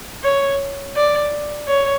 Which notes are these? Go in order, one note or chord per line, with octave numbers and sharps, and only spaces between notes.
C#5
D5
C#5